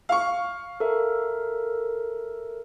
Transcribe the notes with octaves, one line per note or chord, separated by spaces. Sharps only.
F5 C#6
A4 A#4 E5